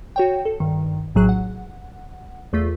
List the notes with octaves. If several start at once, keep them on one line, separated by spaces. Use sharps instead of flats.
F#4 C#5 G5
A4
G2 D#3
A#1 A2 F#3 G#4 F#6
F#5
E2 A3 F4 B6